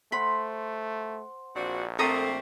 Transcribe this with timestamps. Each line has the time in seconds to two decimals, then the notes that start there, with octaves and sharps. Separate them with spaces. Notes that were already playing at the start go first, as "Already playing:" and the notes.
0.12 A3 C5 F#5 B5 C6
1.56 A#1 C4 D4 F#4
1.99 A3 A#3 C4 A4 A#5 D#6